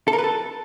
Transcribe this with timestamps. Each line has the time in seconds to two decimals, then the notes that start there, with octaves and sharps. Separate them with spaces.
0.08 A4
0.13 A#4
0.18 B4
0.24 A4